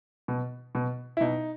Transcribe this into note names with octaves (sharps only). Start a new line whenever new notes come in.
B2
B2
E4
B2 D#4